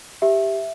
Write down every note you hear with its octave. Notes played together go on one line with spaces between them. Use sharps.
G4 E5